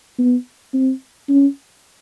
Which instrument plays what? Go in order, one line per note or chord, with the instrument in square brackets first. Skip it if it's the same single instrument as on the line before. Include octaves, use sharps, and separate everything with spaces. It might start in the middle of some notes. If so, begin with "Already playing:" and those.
[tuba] B3
C4
C#4